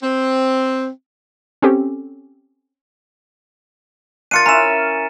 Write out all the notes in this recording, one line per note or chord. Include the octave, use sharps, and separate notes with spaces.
C4
C4 C#4 G4 A4
D4 F4 A#4 A6 C#7 D#7
C#4 E4 A#5 E7